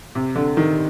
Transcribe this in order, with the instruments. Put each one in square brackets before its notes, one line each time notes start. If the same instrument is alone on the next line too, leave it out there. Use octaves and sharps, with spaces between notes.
[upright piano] C3
D3
D#3